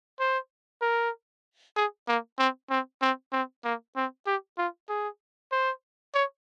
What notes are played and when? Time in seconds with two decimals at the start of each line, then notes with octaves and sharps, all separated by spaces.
0.19 C5
0.82 A#4
1.76 G#4
2.08 A#3
2.39 C4
2.70 C4
3.02 C4
3.32 C4
3.64 A#3
3.96 C4
4.26 G4
4.58 F4
4.89 G#4
5.52 C5
6.15 C#5